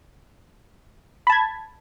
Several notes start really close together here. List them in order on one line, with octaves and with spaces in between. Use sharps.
B5 A5 G#6